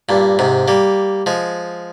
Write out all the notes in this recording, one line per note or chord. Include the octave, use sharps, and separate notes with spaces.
G2 A#2
G#2 C3
G3 A#3
F3 G#3